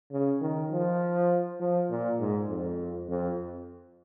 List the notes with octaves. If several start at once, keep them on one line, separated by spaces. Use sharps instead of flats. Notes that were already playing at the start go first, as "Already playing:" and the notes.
C#3
D#3
F3
F3
A#2
G#2
F2
F2